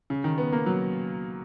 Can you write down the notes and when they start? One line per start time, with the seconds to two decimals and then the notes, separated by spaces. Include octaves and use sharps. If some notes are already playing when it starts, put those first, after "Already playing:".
0.10 C#3
0.24 D#3
0.38 B3
0.52 A#3
0.66 F#3